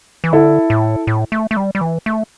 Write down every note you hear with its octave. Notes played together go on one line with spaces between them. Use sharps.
E3
D3 E4 A4
A2
A2
A3
A3
G3
G3
E3
A3